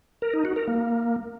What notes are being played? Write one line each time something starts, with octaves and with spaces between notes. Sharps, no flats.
A#4
D#4
F#4
A#4
A#3